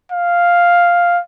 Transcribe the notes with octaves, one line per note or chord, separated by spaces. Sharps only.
F5